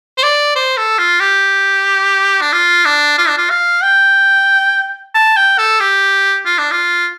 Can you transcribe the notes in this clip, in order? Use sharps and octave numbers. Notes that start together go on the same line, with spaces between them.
C5
D5
C5
A4
F4
G4
D4
F4
D4
F4
D4
F4
F5
G5
A5
G5
A4
G4
F4
D4
F4